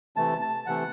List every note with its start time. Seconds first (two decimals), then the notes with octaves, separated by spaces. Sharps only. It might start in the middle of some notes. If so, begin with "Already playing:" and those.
0.16 C3 E3 A3 A5
0.41 A5
0.66 C3 E3 A3 F#5